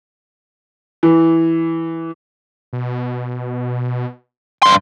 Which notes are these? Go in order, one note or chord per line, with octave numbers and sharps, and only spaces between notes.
E3
B2
G2 C6